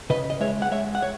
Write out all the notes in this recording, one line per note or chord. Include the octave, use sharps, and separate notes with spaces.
C#3 B4 D#5
D#5
G#3 C#5 E5
F#5
G#3 C#5 E5
F#5
C#5